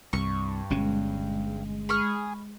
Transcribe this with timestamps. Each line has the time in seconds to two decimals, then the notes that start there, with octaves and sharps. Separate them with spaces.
0.13 C2 G2 C#6
0.70 G1 B2 G#3 C#4
1.89 G#4 B5 C#6 F6